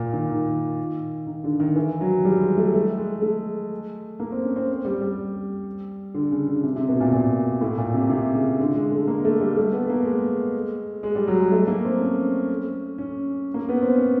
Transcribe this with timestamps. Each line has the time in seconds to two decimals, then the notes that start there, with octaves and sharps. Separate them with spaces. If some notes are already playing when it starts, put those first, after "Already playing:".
Already playing: A#2
0.13 D#3
0.29 D#3
1.27 D#3
1.44 D3
1.60 D#3
1.76 E3
2.01 F#3
2.25 G3
2.41 G#3
2.57 A3
2.74 A3
2.98 G#3
3.22 A3
4.20 A#3
4.32 C4
4.45 C#4
4.56 C4
4.85 G3
5.01 G3
6.14 D3
6.31 C#3
6.48 D3
6.63 C3
6.76 C3
6.89 B2
7.00 A#2
7.13 A#2
7.61 A2
7.78 A#2
7.94 C3
8.10 C3
8.34 C#3
8.60 D3
8.75 G#3
8.92 A3
9.08 A#3
9.24 A3
9.40 G3
9.57 A3
9.72 B3
9.89 A#3
10.05 G#3
11.03 G#3
11.15 G3
11.28 F#3
11.40 G#3
11.52 A3
11.67 A#3
11.85 C4
12.01 C#4
12.98 C#4
13.54 A#3
13.69 B3
13.82 C4
13.96 C#4